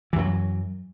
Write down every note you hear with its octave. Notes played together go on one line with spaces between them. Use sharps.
F#2 E3 F#3